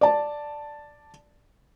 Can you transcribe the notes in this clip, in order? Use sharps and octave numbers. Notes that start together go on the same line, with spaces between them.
D5 A5